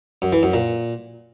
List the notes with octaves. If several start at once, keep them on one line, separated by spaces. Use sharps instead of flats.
F#2
E3
F#2
A#2